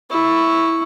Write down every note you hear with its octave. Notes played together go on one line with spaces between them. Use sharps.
E4 C#6